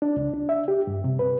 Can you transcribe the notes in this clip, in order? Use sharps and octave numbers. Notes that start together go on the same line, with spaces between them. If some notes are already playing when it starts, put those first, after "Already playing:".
D4
C#2
D4
E5
G4
G2
C3
B4